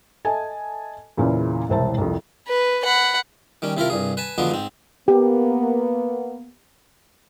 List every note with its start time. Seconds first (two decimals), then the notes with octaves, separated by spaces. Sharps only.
0.25 A4 D#5 E5 G#5 A5
1.17 E2 A#2 C#3 C#4 E4
1.69 E1 C2 C5 E5 A5
1.98 C2 F2
2.48 B4
2.85 F#5 B5
3.62 D#3 G3 C#4
3.77 C3 E4 F4 A#4
3.90 C2 G2 G#4
4.17 B4 G#5 A5
4.38 D3 F3 F#3 G#3 B3
4.51 G#2 C4
5.08 A#3 B3 G4